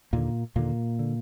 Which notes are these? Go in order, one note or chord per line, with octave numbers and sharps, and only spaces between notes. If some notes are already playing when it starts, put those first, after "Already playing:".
D#2 A#2 D3 A#3
D#2 A#2 D3 A#3
D3